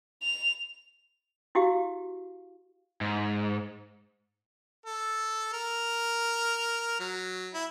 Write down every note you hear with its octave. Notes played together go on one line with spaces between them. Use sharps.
F7
E4 F#4 G4 F5
G#2
A4
A#4
F#3
E4